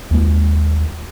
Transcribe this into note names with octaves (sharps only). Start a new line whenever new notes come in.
D#2 G#3